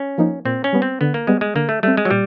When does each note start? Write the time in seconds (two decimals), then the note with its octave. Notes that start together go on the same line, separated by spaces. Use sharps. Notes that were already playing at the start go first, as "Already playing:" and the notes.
Already playing: C#4
0.18 F3 A#3 D#4
0.45 A#2 C4
0.64 C#4
0.73 G3 B3
0.82 C4
1.01 D3 B3
1.14 A#3
1.27 G3 G#3 B3
1.41 G#3
1.55 D3 A#3
1.69 A3
1.83 G3 A3 C4
1.97 G#3
2.05 F#3
2.11 A#2 G3